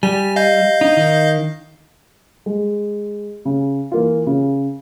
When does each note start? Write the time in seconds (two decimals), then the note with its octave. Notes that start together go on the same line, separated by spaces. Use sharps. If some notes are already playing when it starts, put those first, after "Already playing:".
0.03 G3 G#5
0.36 D#5 F5 G6
0.81 D#4
0.97 D#3
2.46 G#3
3.45 C#3
3.92 E3 A#3 F4
4.27 C#3